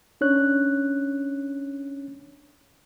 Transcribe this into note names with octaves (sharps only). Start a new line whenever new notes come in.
C#4 D4 C#5 F#6